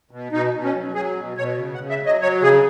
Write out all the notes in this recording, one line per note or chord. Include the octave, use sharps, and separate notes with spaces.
B2
B2 D#4
B2
C#4
F#3
F#3 G#4
B2
B2 C#5
C#3
F#5
C#3
E5
F#3
D#5
F#3 C#5
C#3 G#4